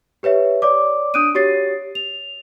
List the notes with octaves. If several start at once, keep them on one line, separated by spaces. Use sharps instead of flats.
G4 B4 C#5 E5
C#5 D5 D6
D4 D#6 F#6 D7 D#7
F#4 G4 C#5 A6 C7
F7